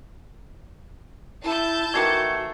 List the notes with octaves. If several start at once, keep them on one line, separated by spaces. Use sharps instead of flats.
E4 A5 G6
D#3 E3 A3 F#4 G#6 C7 C#7